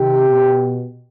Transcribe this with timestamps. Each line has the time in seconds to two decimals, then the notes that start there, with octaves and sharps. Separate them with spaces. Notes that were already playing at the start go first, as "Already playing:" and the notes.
Already playing: C3 D#3 G4
0.29 B2